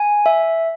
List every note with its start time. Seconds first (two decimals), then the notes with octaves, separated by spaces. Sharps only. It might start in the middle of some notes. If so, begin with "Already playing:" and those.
Already playing: G#5
0.26 E5